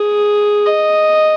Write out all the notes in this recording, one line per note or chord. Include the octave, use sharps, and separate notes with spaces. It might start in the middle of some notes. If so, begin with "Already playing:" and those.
Already playing: G#4
D#5